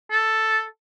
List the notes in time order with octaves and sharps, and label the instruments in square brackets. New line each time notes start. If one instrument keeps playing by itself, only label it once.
[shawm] A4